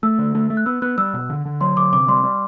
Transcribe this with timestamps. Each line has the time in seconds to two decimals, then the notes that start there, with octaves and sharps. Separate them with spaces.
0.03 A3 E6
0.19 D3
0.35 A3
0.50 A3
0.57 F#6
0.66 B3 E6
0.82 B3 F#6
0.98 G3 E6
1.14 B2
1.30 D3
1.45 D3
1.61 F#3 C6
1.77 D3 D6
1.93 C3 D6
2.08 G3 C6
2.24 G3